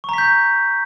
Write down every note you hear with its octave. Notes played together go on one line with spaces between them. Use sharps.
A#5 C#6 G6 B6